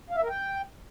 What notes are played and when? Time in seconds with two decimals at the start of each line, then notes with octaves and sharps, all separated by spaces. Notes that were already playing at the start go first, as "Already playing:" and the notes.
0.10 F5
0.17 E5
0.23 A#4
0.29 G5